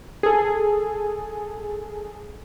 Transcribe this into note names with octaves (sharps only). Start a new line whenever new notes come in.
G#4 A4